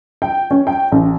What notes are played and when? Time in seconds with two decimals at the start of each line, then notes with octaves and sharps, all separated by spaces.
0.22 G5
0.51 C#4
0.67 G5
0.92 A1